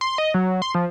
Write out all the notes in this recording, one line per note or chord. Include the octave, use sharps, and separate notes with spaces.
C6
D#5
F#3
C6
F3